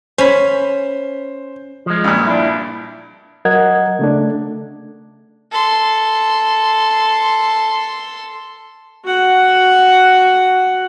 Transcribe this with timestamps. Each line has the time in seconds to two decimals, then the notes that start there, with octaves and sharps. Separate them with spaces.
0.18 C#4 C5 B5
1.86 F3 G#3
2.04 G2 A#2
2.27 D4 E4
3.45 F#3 A#4 D#5 F#5 G#6
3.99 C#3 A3 D4
5.52 A4 C6
9.05 F#4 F#5